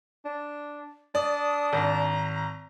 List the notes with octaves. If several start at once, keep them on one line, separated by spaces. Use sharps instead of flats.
D4
D4 D5 D#6
G#1 A#5